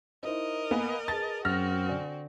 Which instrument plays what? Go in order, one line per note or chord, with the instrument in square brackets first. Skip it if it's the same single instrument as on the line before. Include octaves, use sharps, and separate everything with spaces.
[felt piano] D#4 E4 C5 [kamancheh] A#4 D#5
[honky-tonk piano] A#3 B3 [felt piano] G#5
[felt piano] G#4 B4 A5 [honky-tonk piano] A6
[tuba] F#2 [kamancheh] C4 F#4 [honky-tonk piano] F6 A#6
[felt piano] D3 D5 G#5